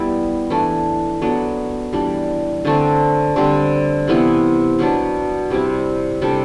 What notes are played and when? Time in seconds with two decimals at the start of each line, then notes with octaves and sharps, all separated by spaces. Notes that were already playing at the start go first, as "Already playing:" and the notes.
Already playing: G3 B3 E4
0.50 E3 A3 D4
1.22 F#3 B3 D4 A4
1.93 E3 G3 D4
2.65 D3 A3 C4
3.36 D3 G3 C4
4.08 C3 E3 B3 E4
4.79 B2 F#3 B3 D4
5.50 C3 G3 C4 E4
6.22 C3 G3 D4 A4